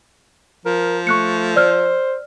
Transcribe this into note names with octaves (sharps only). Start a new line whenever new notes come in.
F3 A#4
A3 C#6 F#6 C#7
C5 D5 E6 F6